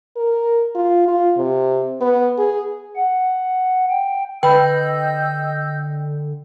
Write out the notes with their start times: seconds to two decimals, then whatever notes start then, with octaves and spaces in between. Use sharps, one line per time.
0.16 A#4
0.75 F4
1.08 F4
1.37 C3
2.01 B3
2.38 G#4
2.96 F#5
3.90 G5
4.43 D3 B4 D#5 G5 B5 E6 G6